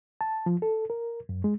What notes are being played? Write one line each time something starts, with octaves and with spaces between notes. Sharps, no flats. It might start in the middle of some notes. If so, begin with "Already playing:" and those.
A5
F3
A4
A#4
F#2
G#3